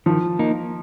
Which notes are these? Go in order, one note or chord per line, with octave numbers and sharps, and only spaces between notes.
D#3 F3
A#3 D#4